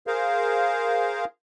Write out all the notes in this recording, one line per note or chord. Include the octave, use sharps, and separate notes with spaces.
G#4 A#4 C5 F5